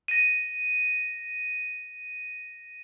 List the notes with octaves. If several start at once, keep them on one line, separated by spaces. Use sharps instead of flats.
A#6 D#7